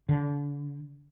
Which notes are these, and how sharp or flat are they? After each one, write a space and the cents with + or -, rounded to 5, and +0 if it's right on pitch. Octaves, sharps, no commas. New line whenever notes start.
D3 -35